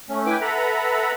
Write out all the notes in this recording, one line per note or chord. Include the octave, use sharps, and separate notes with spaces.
A3 C#4
E4 B4 G5 G#5 D6
A4 B4 E5 F#5 A#5 B5